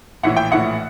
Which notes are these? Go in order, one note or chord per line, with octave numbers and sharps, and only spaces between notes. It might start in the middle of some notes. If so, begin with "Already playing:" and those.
A#1 A2 E3 F#5
G5
A#1 A2 E3 F#5